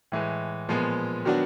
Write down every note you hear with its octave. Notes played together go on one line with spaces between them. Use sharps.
A2 E3 G#3
A#2 F3 G#3 B3
D#3 F#3 B3 D4 F#4